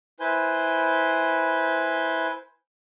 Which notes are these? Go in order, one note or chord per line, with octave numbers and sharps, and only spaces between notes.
E4 B4 C5 G#5 G6